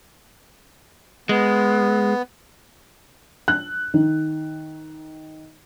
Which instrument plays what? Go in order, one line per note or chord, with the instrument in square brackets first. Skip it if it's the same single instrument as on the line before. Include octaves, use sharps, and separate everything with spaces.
[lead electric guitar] G#3 [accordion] B3
[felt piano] F#6
D#3